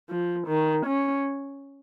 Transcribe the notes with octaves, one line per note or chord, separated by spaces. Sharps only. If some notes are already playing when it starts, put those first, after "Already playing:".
F3
D#3
C#4